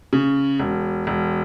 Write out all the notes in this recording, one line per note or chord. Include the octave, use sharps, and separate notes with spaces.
C#3
E1
E1